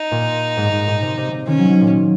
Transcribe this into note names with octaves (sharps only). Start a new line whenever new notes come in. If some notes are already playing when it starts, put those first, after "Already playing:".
Already playing: D#4
A#2
G#2
G#2
A#2
C3
C3
C3
D#3 C#4
F#3
F#3
A#2